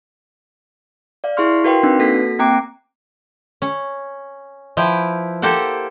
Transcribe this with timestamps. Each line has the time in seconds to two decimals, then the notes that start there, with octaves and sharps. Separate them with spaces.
1.24 D5 F5
1.37 E4 G#4 F5 C6 C#6 F6
1.64 F#4 A#4 B4 F5 G5 C6
1.83 C4 D4 D#4 B4
1.99 A#3 F#4 A4 A#6 B6
2.39 A#3 C4 G5 A#5 D6 D7
3.62 C#4
4.77 F3 E4 B4 G5
5.42 A#3 G4 A4 C5 F#5